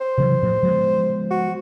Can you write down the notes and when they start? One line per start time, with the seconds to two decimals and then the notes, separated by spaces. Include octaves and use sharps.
0.01 C5
0.18 C3 E3 F#3
0.43 A2 F3
0.63 F3 G#3 B3
1.31 F#4